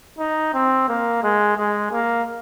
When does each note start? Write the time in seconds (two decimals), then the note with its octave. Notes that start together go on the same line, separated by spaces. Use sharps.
0.19 D#4
0.54 C4
0.89 A#3
1.23 G#3
1.58 G#3
1.92 A#3